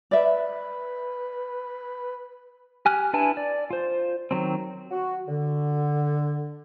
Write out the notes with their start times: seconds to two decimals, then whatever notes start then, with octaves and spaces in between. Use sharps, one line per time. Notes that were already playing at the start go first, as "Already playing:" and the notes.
0.11 B4 D5 E5
2.85 G4 G#5 F6 F#6
3.13 D4 E4 B4 G#5 A5
3.37 D5
3.71 F4 C5
4.31 D#3 F#3 C4
4.91 F#4
5.27 D3